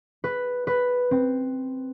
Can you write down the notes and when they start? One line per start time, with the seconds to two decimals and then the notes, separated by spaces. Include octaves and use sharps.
0.24 B4
0.67 B4
1.11 C4